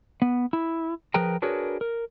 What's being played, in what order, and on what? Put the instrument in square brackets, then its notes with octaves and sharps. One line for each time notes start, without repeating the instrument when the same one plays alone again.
[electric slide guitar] B3
E4
F3 G#4 A#4 B4 G5 A#5
D4 F#4 G#4 A#4 B4 C#5
A#4